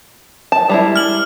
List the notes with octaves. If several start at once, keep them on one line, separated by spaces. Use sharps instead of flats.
A5
G3 G#3 E4
F6 F#7